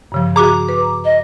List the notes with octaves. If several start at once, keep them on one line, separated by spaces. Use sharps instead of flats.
G2 C#3 F3
F#4 G#4 A#5 D6
B4
D#5